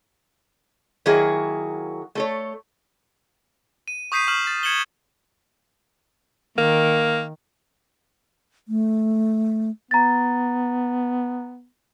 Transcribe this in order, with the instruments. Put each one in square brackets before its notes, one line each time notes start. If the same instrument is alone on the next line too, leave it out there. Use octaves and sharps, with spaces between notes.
[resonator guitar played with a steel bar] D#3 F#3 A#3 E4 F#4 G#4
A3 A4 C#5
[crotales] D#7
C#6 D#6 G6 B6 C7 D#7
C#6 F6 E7 F#7
A6
G#6 C#7 E7 F#7 G7
[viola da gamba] D#3 [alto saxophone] A#3
[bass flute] A3
[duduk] B3 [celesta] A#5 A6